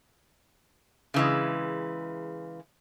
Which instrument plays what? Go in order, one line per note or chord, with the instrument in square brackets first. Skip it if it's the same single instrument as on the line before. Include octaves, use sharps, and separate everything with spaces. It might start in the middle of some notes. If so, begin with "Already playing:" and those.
[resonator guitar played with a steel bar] C#3 E3 G#3